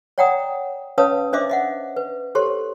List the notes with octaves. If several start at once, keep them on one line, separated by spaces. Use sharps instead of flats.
C#5 D5 F#5 G5 A#5 D#6
C#4 B4 C#5 F5 A5 D#6
D4 C5 D#5 E5 D6
D#5 E5 F#5
B4
G4 A4 C5 C#5 C6